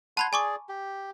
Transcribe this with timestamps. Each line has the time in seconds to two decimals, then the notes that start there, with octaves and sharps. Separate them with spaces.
0.17 F#5 A5 B5 C6 G#6
0.33 G#4 D5 G#5 C#6 D6
0.69 G4